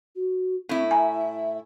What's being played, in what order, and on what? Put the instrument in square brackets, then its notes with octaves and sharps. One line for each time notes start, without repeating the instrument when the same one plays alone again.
[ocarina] F#4
[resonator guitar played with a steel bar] A2 E4 [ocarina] C4
[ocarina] E5 [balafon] G#5 A#5